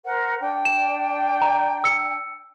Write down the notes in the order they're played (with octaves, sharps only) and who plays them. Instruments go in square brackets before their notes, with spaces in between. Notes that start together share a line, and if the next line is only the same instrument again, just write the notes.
[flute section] A#4 C5 F#5
D4 G5
[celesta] E7
A#5
E6 C#7